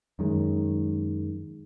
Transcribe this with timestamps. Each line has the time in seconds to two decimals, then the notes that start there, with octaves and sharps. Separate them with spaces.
0.19 F#2 D#3 G#3